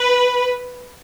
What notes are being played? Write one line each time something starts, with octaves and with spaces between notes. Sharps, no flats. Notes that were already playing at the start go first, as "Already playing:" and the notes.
Already playing: B4